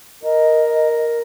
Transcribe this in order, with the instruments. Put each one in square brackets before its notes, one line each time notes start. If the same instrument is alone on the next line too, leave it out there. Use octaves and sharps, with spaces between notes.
[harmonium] A#4 [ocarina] D#5